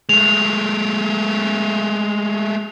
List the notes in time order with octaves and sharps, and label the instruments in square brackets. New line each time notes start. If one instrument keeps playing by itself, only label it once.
[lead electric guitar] G#3 A3 [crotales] F7